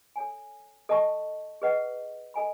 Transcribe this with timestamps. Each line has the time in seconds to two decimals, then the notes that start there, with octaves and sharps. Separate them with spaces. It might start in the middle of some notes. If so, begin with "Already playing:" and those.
0.16 A4 C#5 G#5
0.89 A4 D#5 A5 C#6
1.62 G#4 B4 D#5 F#5
2.34 A4 D#5 G#5 B5